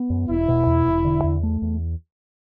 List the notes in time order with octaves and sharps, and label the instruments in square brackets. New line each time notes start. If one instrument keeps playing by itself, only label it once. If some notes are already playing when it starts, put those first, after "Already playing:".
Already playing: [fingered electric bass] B3
F#2
[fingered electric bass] E1 [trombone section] E4
[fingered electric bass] B2
E2
E1
D3
E2
A3
E2